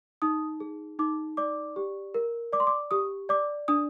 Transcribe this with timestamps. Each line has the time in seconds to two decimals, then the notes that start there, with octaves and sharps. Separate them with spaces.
0.22 D#4 D#6
0.60 G#4
0.99 D#4 D6
1.37 D5 D6
1.76 G4
2.14 A#4
2.53 D5 D6
2.60 C6
2.67 D6
2.91 G4 D#6
3.29 D5 D6
3.68 D4 D#6